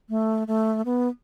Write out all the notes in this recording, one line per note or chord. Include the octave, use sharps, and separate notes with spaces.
A3
A3
B3